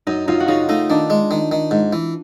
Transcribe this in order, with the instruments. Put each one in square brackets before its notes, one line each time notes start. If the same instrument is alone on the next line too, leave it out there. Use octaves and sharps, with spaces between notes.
[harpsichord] F#2 [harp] D#4
[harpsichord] F#2 [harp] D#4 F4
[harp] F#4
[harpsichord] C#3 [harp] D#4 F4
[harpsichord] A3 [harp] D#4
[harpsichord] D#3 [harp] D4
[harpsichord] G#3
D#3
D#3
G#2
E3